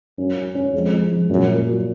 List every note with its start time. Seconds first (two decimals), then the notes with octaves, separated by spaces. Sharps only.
0.18 F#2 C#4
0.36 F#3
0.55 C#4
0.73 F2 G#3
0.92 F3
1.11 F3
1.29 F#2 A#2
1.49 A#3
1.67 F#3